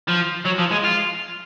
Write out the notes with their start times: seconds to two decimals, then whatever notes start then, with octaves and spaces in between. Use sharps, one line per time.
0.08 F3
0.45 F#3
0.58 F3
0.71 G#3
0.84 F4